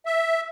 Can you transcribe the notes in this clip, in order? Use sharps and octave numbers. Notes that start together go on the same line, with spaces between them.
E5